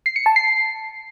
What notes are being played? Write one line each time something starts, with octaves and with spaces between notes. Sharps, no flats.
C7
C#7
A5
C7